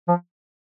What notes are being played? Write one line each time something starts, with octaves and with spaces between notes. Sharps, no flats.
F3